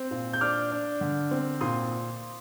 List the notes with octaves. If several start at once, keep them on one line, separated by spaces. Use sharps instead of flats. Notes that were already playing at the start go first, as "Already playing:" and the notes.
Already playing: C4
A#2
G6
D4 D6 F6
D4
D3
C4
A#2 C6 D#6